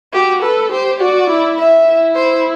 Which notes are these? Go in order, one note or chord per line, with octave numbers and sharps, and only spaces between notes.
F#4 G4
A4 B4
G4 C5
F#4 D5
E4
E5
E4
C5